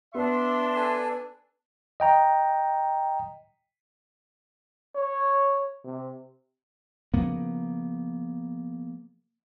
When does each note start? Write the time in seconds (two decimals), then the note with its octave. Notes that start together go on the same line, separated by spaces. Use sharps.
0.15 B3 D4 E5 C6
0.76 A4 B4 G#5
2.00 D#5 G5 A#5
4.95 C#5
5.84 C3
7.14 C#3 F3 A#3 B3